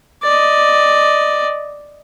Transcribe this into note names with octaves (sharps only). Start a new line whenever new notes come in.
D5 D#5